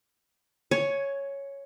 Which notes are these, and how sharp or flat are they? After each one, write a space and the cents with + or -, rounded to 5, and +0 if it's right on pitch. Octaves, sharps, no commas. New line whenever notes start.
C#5 +0 G#5 +15